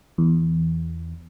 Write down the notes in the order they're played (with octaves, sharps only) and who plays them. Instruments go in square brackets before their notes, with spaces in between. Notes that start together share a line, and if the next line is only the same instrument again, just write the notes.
[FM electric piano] E2